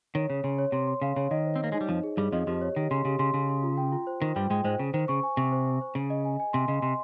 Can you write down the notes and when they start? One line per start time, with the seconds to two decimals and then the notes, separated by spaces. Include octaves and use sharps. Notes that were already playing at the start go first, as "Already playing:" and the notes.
0.15 D#3 C#5
0.30 C#3 C#5
0.44 C#3 C6
0.58 C#5
0.72 C3 C6
0.87 C6
1.02 C#3 F5
1.16 C#3 C#5
1.31 D#3 D#5
1.46 C5
1.56 C4
1.60 A#3 D#5
1.72 G#3 D#4
1.81 G3
1.89 F2 F3 D#4
2.03 G#4
2.17 G2 G3 G#4
2.32 F2 F3 D#5
2.47 F2 F3 G4
2.62 C#5
2.76 D#3 G4
2.91 C#3 C6
3.05 C#3 G4
3.19 C#3 C6
3.34 C#3 C6
3.49 C6
3.63 F4
3.77 G5
3.92 F4
4.07 C5
4.21 D#3 C5
4.36 G2 G3 G5
4.50 G#2 G#3 G5
4.64 G#2 G#3 C5
4.79 C#3 C5
4.94 D#3 C5
5.08 C#3 C#6
5.23 G#5
5.37 C3 C#6
5.52 C5
5.67 C5
5.81 C5
5.95 C#3 G#4
6.10 D#5
6.25 G#5
6.40 G#5
6.53 C3 C6
6.68 C#3 D#5
6.82 C3 C6